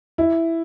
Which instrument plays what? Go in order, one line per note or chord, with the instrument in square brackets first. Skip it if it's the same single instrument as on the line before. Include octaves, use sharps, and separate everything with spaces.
[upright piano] E4